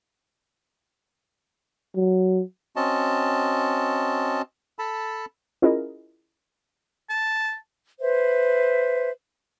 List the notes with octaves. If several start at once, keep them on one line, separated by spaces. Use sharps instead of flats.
F#3
C4 C#4 F#4 D#5 A5
A4 A5 B5
C#4 E4 F4 G#4 A#4 D#5
A5
B4 C5 E5